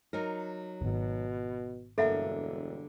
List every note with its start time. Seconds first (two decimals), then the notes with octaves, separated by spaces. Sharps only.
0.13 F#3 D#4 A#4
0.82 D#1 G#1 B2
1.98 E1 G2 D3 A#3 A4 E5 F#5